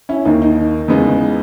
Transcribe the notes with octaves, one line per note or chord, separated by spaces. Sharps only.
C#4 E4
D#2 D#3 A#3 D#4
D#4
E2 C#3 G#3 B3